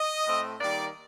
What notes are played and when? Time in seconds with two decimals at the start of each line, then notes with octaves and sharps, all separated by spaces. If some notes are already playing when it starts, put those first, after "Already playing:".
Already playing: D#5
0.25 A2 A3 C4
0.61 D#3 G3 A#3 D5